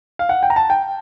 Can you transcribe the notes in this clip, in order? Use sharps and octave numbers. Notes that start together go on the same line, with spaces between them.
F5
F#5
G5
A#5
A5
G5